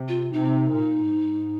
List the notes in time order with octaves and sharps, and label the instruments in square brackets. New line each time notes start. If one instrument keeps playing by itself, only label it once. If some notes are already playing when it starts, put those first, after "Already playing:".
Already playing: [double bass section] C3
[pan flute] F4
[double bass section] C3 [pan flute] D#4
[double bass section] A#2
G#2